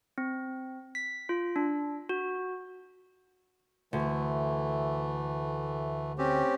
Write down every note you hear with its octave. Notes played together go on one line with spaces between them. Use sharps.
C4
B6
F4
D4
F#4
D2 E3 A3
C4 C#4 G4